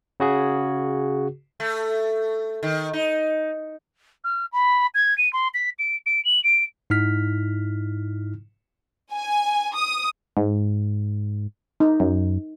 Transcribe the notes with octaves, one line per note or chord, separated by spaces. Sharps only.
C#3 F#4 G#4
A3
D#3
D#4
F6
B5
G#6
D#7
C6
B6
D7
D7
F#7
D7
G#2 D#4 E4 F6 B6
G#5
D#6
G#2
D#4
F#2